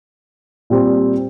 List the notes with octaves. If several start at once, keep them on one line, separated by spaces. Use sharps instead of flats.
A#2 G3 C4